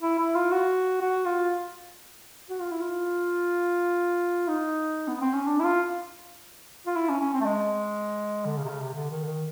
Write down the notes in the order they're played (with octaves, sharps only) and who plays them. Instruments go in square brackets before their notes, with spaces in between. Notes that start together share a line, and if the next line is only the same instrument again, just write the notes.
[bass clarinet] E4
E4
F4
F#4
F#4
F4
F#4
F4
E4
F4
D#4
B3
C4
C#4
D4
E4
F4
F4
E4
C#4
C#4
C4
A3
G#3
D3
C#3
C3
C#3
C3
D3
D#3
D3
D#3